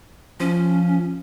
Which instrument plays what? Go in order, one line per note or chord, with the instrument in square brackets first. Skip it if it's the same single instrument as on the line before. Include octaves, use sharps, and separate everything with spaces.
[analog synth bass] F3 [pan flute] C#4